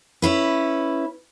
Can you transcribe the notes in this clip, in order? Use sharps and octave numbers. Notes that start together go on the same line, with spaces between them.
C#4 E4 B4